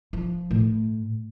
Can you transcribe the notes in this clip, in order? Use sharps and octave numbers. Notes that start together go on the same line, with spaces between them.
F3
A2